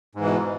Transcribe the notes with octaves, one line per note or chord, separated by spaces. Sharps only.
G#2 B2 E3